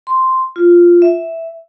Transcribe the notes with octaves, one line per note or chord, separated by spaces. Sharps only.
C6
F4
E5